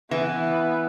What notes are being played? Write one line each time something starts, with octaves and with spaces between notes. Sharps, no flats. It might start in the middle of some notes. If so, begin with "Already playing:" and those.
E3 B3